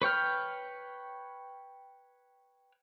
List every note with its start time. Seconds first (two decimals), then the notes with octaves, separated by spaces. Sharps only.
0.02 B4 C#5 G5 F6